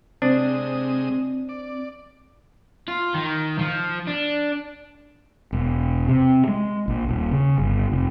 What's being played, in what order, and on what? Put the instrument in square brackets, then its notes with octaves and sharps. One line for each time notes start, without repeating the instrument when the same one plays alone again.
[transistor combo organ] C3 G#3 D#6 [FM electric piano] C4 [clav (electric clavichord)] D4
[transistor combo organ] D5
[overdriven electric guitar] F4
D#3
F3
D4
[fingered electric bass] E1
C3
G#3
A#1
D#1
C#3
G1
F1